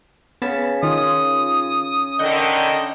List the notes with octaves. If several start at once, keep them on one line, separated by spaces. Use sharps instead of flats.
C#3 B3 A5 B6
D#3 F4 D#6
D3 D#3 D#5 F#5 G6